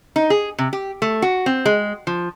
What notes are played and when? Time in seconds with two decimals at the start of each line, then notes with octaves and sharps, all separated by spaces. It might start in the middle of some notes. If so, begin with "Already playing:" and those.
0.16 D#4
0.30 G#4
0.59 C3
0.73 G4
1.02 A3
1.22 F#4
1.46 C4
1.65 G#3
2.07 F3